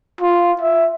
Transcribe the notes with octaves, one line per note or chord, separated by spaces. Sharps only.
F4
E5